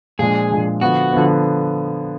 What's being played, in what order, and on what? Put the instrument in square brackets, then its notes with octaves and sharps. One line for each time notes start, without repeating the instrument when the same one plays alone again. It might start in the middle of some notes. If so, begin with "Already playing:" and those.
[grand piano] A#2 F3 G#3 D4 [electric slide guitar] G#4
[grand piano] A#2 F3 G#3 D4
[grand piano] D3 F3 B3 [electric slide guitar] F#4
[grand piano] D3 F3 B3